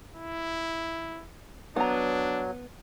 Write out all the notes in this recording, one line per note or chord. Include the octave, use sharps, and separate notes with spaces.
E4
F#3 B3 D4 A#5